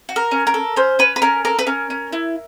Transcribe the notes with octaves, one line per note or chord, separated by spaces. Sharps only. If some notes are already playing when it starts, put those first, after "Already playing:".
F#4
A#4
C#4
A#4
A4
C#4 C5
C#4 B4
B4
C#4 A#4
A4 A#4
B4
C#4 A#4
C#4
E4